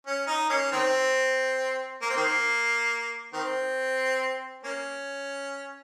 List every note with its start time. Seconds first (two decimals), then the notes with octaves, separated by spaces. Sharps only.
0.07 C#4
0.27 D#4
0.49 A#3 C#4
0.72 D#3 C4
2.02 A#3
2.10 C4
2.16 D#3 A#3
3.33 D#3 C4
4.63 A#3 C#4